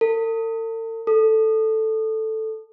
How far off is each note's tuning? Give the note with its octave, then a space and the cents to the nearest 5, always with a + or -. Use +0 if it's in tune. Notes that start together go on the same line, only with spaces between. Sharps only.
A4 +45
A4 +0